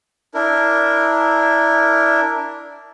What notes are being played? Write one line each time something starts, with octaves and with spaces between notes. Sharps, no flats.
D4 E4 A#4